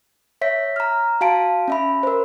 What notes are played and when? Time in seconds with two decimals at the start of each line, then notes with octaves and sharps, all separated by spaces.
0.41 C#5 E5 B6
0.76 A#5 F6
1.21 F#4 F5 A5 D7
1.68 C#4 E5 B5
2.03 A#4 C5